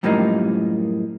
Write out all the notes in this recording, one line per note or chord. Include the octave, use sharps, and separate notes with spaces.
F#2 A2 F3 G3 A#3 D#4